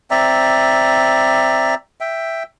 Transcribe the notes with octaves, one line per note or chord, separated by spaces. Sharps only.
C4 D5 E5 A#5
E5 G5